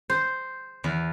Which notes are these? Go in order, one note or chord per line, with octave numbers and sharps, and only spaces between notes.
C5
E2